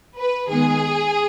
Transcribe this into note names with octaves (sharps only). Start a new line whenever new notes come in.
B4
D#3 G#3 B3 G#4